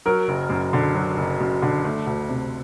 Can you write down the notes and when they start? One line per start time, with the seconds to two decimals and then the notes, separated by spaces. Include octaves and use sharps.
0.06 F#3 A#4
0.28 F#1
0.50 F#2
0.73 D3
0.95 F#3
1.17 F#1
1.40 F#2
1.62 D3
1.85 A3
2.07 D2
2.29 C3